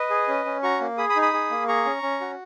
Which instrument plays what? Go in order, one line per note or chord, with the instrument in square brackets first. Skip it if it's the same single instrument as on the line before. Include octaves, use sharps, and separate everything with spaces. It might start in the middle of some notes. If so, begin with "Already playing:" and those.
Already playing: [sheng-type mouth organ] B4 D#5
G#4
C#4
C#4
F#4 A#5 C#6
A#3
G#4 B5 D#6
B5 D#6
D#4
B5 D#6
G#4
A#3
G#4 A#5 C#6
C#4
C#4
F#4